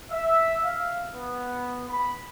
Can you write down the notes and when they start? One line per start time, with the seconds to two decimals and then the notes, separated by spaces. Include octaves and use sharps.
0.11 E5
0.63 F5
1.13 B3
1.89 B5